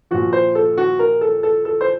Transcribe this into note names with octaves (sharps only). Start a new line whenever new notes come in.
A#2 F3 F#4
C5
A4
F#4
A#4
A4
A4
A4
C5